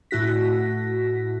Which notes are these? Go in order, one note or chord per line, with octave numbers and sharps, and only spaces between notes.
A2 A3 E4 F#4 A#6 B6